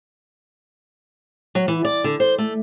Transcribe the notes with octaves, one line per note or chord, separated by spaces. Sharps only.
F#3
E3
D5
D3
C5
A3